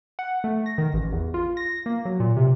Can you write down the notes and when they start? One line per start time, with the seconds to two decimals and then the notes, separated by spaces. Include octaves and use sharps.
0.19 F#5
0.44 A3
0.66 A#6
0.78 D#3
0.93 A1
1.12 E2
1.34 F4
1.57 A#6
1.86 A#3
2.05 F#3
2.20 A#2
2.37 C3